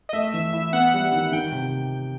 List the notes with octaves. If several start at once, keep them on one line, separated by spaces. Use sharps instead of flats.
D#5
A3 E5
E3 E5
E4 E5
B3 F#5
G3 F#5
D#3 F#5
D#3 G5
C3